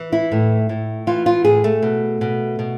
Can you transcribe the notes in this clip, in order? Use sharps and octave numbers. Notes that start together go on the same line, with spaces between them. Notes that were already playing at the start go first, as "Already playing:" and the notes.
Already playing: E3
E4
A2
A2
E3 F4
F4
A2 G#4
A3
B2
B2
B2